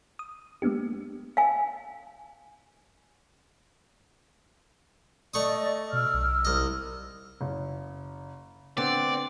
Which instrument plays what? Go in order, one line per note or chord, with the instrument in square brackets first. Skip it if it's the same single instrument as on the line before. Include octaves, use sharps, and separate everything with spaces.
[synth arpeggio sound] D#6
G#3 A#3 B3 D4 G4
[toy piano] F5 G#5
[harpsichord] A3 C#6 D#6 [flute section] D5 D#5
[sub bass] B2 [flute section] E6 F6
[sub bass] B1
[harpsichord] C2 D#5
[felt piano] F#1
[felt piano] D3 [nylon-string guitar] B3 [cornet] C4 [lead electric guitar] D5